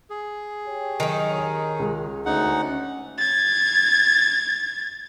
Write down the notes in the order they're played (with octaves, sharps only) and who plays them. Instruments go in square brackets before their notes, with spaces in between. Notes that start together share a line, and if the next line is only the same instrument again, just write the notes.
[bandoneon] G#4
[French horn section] G4 C#5
[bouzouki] D#3 D#4 [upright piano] F#3
[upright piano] G#5
C#2 G#3
[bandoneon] D2 D#4 F#5 [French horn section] C#4
[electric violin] G#6 A6